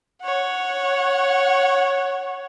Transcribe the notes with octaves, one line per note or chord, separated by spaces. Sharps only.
C#5 F#5